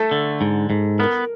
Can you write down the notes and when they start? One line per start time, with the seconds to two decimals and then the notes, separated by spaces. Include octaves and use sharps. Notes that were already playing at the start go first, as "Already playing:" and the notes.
Already playing: A3 A4
0.11 D3
0.41 G#2
0.70 G#2
0.99 B3 A#4